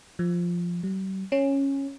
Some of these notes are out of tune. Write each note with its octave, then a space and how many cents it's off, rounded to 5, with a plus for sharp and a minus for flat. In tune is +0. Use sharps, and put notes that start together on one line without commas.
F3 +0
G3 -45
C#4 -10